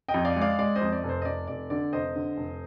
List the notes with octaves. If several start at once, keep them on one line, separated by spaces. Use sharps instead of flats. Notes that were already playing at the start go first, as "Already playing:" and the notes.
D#5 G5
F2
D5 F5
G#3
D5 F5
G#3 D5
C5 D#5
F2
D5
F1
C5
D#5
F1 D5
F1 D5
D3 D5
F1 C5 D#5
D3
F1